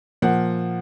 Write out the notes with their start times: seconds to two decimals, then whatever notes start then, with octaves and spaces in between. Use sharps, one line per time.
0.22 A#2 F3 F#5